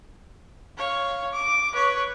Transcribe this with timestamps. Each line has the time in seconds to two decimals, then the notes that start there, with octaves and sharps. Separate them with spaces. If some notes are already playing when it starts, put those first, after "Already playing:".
0.78 C#5 F5
1.33 D6
1.73 B4 C#5